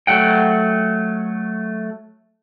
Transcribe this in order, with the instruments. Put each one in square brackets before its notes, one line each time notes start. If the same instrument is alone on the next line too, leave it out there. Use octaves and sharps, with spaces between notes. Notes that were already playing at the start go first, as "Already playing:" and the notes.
[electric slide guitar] F#3 A3 F#5 G5